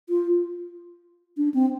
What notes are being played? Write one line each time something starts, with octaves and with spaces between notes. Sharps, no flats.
F4
D4
C4